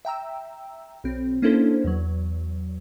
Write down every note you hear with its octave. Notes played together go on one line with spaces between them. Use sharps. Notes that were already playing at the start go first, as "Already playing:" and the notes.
E5 G5 A#5 E6
B1 C4
A#3 C#4 D4 E4 A4 C5
E2 F#3